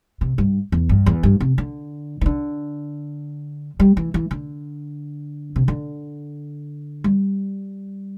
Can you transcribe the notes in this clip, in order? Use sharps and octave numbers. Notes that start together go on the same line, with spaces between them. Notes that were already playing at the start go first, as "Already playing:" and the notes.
C3
G2
E2
G2
E2
G2
C3
D3
E3
D3
G3
E3
E3
D3
C3
D3
G3